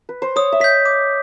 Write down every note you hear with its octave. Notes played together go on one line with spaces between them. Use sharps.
B4
C5
C#5 D#6
E5
D#5 G6 B6
D6